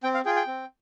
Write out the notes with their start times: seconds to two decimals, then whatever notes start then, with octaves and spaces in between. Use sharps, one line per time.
0.03 C4 G5
0.14 F5
0.25 F4 G#4 G5
0.36 G5
0.47 C4